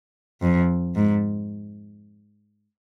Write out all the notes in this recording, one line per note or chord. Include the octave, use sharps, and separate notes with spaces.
F2
G#2